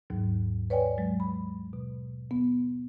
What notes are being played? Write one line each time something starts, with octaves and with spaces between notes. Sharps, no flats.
D#2 G#2 F#3
B4 C#5 D5 G5 G#5
F#3 G#3
B5
B2
B3